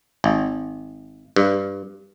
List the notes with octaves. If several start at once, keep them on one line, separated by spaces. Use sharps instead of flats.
G#1
G2